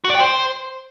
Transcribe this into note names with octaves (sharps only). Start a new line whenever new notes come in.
F#4
D5
G5
C5